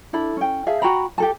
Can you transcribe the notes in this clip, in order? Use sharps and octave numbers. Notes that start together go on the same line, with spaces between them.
D4 E4 A4 B5
C#4 G5
G#4 E5 F5 A5
F#4 G5 A#5 B5
G4 A4 A5